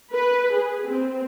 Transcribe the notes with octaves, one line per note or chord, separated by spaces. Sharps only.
B4
G#4
C4